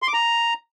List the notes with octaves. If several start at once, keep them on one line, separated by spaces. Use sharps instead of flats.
C6
D6
A#5